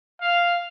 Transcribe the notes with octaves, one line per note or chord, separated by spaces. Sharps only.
F5